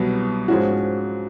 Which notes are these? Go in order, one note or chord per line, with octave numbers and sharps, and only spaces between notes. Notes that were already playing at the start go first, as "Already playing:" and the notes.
Already playing: C2 B2 F#3 B3
G#2 F3 G#3 C#4 F#4